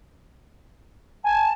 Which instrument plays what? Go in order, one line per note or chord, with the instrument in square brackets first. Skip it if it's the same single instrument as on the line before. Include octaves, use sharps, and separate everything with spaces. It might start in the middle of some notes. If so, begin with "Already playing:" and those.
[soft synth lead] G#5 [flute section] A5